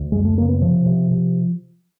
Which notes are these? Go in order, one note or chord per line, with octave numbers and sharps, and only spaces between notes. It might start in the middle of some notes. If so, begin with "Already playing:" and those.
Already playing: D2
F#2 G#3
A3
C#3 A#3
B3
C3 F3
C3
C3